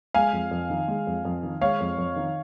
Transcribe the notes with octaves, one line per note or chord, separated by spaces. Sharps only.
G#3 F5 G#5
F2
F2
D#3
G#3
F2
F2
D#3
G#3 C#5 F5
F2
F2
D#3